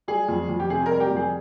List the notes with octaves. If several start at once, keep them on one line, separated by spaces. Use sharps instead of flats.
G3 G#4
F2
F2
G4
C3 G#4
G3 A#4
G4
F2
G#4